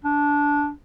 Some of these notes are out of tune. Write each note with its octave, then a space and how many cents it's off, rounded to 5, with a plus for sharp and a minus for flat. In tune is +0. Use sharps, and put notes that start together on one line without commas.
D4 -15